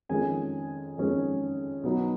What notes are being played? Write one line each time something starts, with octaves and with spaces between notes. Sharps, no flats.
F2 D#3 G#3 C#4 G#5
F2 D#3 G#3 C#4
B2 F#3 B3 D#4